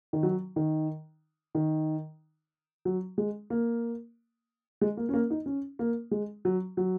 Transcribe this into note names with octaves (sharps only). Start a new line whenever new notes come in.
D#3
F#3
D#3
D#3
F#3
G#3
A#3
G#3
A#3
C#4
A#3
D#4
C#4
A#3
G#3
F#3
F#3